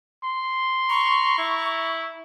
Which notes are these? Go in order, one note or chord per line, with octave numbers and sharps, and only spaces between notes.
C6
A#5 B5 C#6
E4